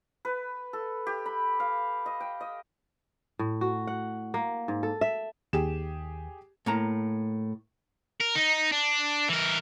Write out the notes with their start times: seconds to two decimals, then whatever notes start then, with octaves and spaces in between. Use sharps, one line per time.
0.25 B4
0.73 A4
1.07 G4
1.26 B5
1.60 F5
2.06 D#5
2.20 G5
2.41 D#5
3.39 A2
3.61 F#4
3.87 F#5
4.34 A#3
4.68 G#2
4.83 A4
5.01 E5
5.53 D#2 G4 G#4 E7
6.66 A2 A#3 A#5
8.21 A#4
8.36 D#4
8.72 D4
9.29 E3 A#4